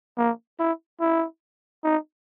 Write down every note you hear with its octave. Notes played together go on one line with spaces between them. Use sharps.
A#3
E4
E4
D#4